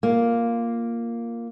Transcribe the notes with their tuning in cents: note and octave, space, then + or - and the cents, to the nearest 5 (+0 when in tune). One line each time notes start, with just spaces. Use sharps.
A#3 +0 F4 +0